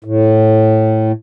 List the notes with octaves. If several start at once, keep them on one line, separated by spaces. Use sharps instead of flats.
A2